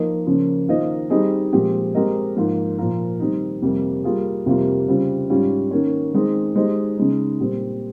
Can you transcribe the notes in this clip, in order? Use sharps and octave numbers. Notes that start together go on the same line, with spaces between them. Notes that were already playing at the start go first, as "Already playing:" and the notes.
Already playing: F3 A#3 D#4 A#4 D#5
C#3 F3 A#3 C#4
D#3 A#3 F4 C5 D#5
G3 C4 D#4 G#4 D#5
A#2 F3 G#3 C4 G4
G#3 C4 G4 A#4 D#5
G#2 F3 A#3 F4
A#2 F3 A#3 F4 A#4
D#3 G3 C4 D#4
F2 C3 G3 A#3
G3 A#3 F4 G#4
F2 C3 G3 A#3 F4
C#3 G3 C4 F4
G#2 G3 C#4 F4
D#3 A#3 C#4
D#3 G#3 C4 D#4 G#4
G#3 D#4 G4 C5 D#5
C#3 G#3 D#4
A#2 G3 C4